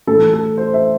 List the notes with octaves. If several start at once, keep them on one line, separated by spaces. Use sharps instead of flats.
A2 E3 A4
A4
C5
E5